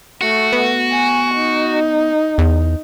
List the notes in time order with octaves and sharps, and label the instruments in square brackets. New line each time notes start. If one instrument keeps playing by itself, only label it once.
[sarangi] A3 [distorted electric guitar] F#4
[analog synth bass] B3
[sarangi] G#5
D#4
[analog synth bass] E2